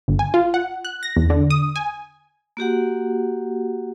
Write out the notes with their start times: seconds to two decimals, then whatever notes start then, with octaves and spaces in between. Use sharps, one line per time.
0.08 G1
0.19 G#5
0.34 F4
0.54 F#5
0.85 F#6
1.03 A#6
1.17 E2
1.30 D3
1.50 D#6
1.76 G#5
2.57 A#3 F#4 G4 F#5